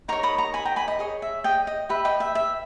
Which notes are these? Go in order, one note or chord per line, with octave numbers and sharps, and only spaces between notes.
D#4 A#4 C#5 A#5 C#6
B5 D#6
A#5 C#6
G#5 B5
G5 A#5
G#5 B5
D#5
G#4 C#5 D#5
E5
D#5 G5
D#5
G4 B4 D#5 E5
D#5 G5
E5
E5